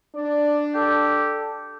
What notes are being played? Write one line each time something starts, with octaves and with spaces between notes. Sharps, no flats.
D4 D5
G4 A4